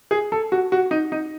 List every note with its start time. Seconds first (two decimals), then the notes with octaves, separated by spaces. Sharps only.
0.11 G#4
0.32 A4
0.52 F#4
0.72 F#4
0.91 D#4
1.12 D#4